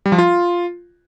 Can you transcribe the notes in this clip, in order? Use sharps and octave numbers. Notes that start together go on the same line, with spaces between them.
G3
F3
F4